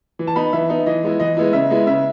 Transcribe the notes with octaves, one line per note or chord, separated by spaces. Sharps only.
E3
A5
B3 D#4 B5
E3 E5
B3 D#4
E3 D#5
G#3 B3 E4
E3 D#5
G#3 B3 E4
C#3 E5
G#3 B3 E4
C#3 E5